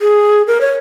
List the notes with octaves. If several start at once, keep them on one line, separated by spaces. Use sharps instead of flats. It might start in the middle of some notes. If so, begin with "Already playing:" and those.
G#4
A#4
C#5